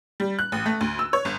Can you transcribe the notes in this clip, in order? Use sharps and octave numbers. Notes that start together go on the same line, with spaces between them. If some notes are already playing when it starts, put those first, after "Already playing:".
G3
F#6
A1
A3
D2
E6
C#5
G1